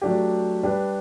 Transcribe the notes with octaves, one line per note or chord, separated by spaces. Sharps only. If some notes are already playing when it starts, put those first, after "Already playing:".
F#3 A3 D4 G4
G3 D4 G4 B4